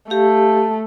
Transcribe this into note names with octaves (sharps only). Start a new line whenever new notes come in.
A3 G4 F5